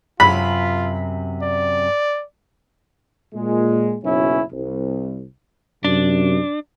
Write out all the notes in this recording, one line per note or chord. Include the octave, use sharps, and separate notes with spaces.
F#2 C3 F4 B5
D5
A#2 G#3
F#1 B1 C#4 E4
C2
F#2 C3 D4